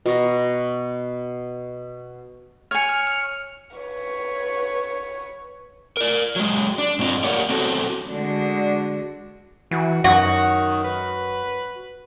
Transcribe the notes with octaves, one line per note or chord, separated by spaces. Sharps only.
B2 A#5
C#5 G#5 F6 C#7
B4 C#5
A#4 D5
F#3 G#3
D4
G2 C4 F4 D#5
A#3 G4 A#4 C#5 D5 F#5
B3 C4 F#4 A4
D3 G#3 D4 F#4
E3 F#4
F#2 D#3 F#4
B4